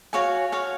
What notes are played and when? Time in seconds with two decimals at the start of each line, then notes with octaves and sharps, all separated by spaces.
0.13 F#4 C#5 F5 G#5
0.52 F#4 C#5 F5 G#5